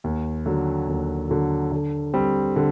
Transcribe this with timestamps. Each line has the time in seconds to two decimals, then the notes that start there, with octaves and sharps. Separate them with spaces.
0.04 D#2
0.45 D3 F#3
0.88 D#2
1.29 D3 F#3
1.72 D3
2.14 G3 C4
2.56 D3